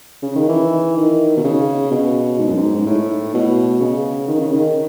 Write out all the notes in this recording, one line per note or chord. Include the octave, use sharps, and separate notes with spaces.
C#3
D#3
E3
D#3
B2
C#3
B2
G#2
F#2
G#2
G#2
A2
B2
C#3
D#3
C#3
D#3